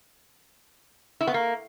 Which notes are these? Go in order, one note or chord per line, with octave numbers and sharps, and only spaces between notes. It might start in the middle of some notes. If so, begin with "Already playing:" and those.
E4
B3
A#3